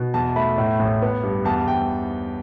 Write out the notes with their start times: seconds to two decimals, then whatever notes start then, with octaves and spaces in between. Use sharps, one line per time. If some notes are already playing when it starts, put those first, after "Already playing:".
Already playing: B2
0.14 E2 A5
0.36 A3 B5
0.58 A2
0.80 A1
1.02 B3
1.23 G2
1.45 E2 A5
1.67 E2 G5